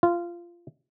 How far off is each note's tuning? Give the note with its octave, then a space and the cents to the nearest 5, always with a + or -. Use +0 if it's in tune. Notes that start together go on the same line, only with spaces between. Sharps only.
F4 -15